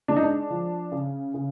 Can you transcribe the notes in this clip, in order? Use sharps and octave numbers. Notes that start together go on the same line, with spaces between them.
G#3 D4
D#4
D4
F3
C#3
C#3